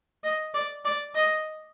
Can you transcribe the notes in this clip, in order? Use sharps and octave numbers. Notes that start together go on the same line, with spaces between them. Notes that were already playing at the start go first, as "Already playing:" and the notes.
D#5
D5
D5
D#5